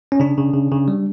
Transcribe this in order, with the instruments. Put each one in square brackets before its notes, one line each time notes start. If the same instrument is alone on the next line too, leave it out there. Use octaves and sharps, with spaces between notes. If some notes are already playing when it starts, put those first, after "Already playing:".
[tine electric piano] C#4
C#3 D4
C#3
C#3
C#3
G3